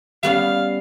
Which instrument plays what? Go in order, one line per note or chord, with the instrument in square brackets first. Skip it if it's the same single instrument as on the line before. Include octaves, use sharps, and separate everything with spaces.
[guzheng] G3 B3 C#4 [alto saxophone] F5